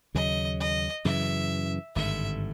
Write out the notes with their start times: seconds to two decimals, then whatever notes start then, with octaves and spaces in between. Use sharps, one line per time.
0.14 D#2 C#3 F#3 D#5
0.60 D#5
1.05 F#2 C#3 E3 E5
1.95 G#1 G2 D3 E5